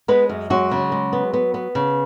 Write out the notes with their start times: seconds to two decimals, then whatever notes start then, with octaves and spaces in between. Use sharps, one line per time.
0.08 G#3 B3 B4
0.29 F#2
0.50 F#3 G#3 F#4
0.71 C#3
0.92 G#3
1.13 B3
1.34 B3
1.54 B3
1.75 C#3